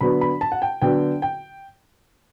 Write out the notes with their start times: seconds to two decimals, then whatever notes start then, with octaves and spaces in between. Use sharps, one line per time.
0.01 D3 F#3 B3 B5
0.21 B5
0.41 A5
0.52 F#5
0.62 G5
0.82 D3 F#3 B3 G5
1.22 G5